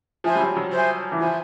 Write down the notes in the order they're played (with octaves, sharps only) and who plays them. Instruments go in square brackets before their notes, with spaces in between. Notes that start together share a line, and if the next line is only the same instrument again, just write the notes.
[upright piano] F3 [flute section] C5 E5 G#5
[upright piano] G3
F#3
F#3
[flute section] C5 E5 G#5
[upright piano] E3
[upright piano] F3 [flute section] C5 E5 G#5